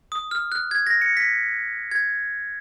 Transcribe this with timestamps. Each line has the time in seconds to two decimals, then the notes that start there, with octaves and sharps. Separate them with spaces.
0.12 D#6
0.31 F6
0.52 F#6
0.71 G#6
0.87 A#6
1.02 C#7
1.17 B6
1.91 G#6